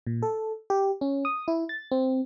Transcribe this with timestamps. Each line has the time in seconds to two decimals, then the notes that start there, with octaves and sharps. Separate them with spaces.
0.07 A#2
0.22 A4
0.70 G4
1.01 C#4
1.25 D#6
1.48 E4
1.69 A6
1.91 C4